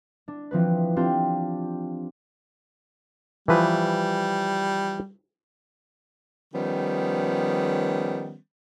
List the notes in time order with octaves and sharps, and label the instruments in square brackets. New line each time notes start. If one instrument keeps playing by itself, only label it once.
[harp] D4
E3 F3 C4 B4
C4 D4 F4 G4 G5
[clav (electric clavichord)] E3 F3 B4 [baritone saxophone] G3
[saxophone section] D#3 F3 G3 B3 C#4